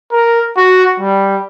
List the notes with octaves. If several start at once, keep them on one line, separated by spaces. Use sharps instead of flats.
A#4
F#4
G3